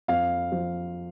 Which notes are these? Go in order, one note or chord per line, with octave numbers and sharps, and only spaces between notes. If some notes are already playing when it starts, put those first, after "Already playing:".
F2 F5
F3